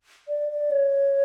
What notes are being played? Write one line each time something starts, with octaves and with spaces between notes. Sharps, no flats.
D5
D5
C#5